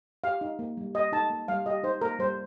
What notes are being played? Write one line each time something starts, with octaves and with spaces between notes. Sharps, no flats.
G4 F5
D#4
A#3
G3
G4 D#5
D#4 A5
A#3
G3 F5
G4 D#5
D#4 C5
A#3 A#4
G3 C5